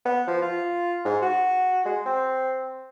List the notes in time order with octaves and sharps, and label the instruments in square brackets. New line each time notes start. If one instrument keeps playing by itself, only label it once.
[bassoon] B3
F3
F4
G#2
F#4
G#3
C4